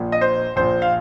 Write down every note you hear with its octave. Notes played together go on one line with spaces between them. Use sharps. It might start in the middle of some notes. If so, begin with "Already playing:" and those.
Already playing: A#1 A#2
D#5
C5
A#1 A#2 C5
F5